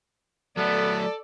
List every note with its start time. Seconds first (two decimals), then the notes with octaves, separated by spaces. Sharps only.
0.57 F#3 A3 B3 A4 D5